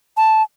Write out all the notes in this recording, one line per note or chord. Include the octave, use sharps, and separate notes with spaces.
A5